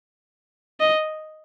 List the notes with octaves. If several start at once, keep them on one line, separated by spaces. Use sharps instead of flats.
D#5